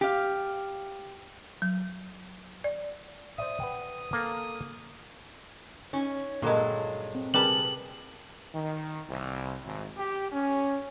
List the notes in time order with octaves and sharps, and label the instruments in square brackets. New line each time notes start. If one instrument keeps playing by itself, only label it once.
[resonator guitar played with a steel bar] G4 F5
[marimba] F#3
D5
[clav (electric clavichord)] C5 D5 E5 [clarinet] D#6
[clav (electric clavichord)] B4 F#5 G5
A#3 A4 F5
[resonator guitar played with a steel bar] C#4 [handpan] D#4
[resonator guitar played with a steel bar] G2 F#3 G#3 [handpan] A#2 A4 A#4
[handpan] C4
[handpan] C3 G#4 A#4 [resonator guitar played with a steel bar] G3 B4 A5 [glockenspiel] F#7
[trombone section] D#3
C2
G#1
G4
C#4